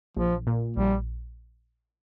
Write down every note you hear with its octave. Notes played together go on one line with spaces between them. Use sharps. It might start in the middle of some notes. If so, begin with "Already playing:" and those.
A#1 F3
A#2
A#1 G3